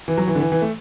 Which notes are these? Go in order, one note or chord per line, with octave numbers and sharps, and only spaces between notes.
E3
F#3
E3
D3
E3
E3
A3